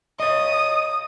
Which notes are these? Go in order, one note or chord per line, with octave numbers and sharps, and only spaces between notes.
C#5 D#5 D#6